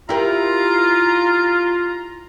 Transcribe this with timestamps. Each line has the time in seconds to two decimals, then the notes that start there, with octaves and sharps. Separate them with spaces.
0.09 E4 F4 G4 A#4 A#5